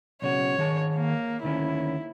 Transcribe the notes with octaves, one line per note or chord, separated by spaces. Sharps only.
B1 C#3 F#4 C#5
D#3 G#4 A5
A#3
D2 D#3 C#4 E4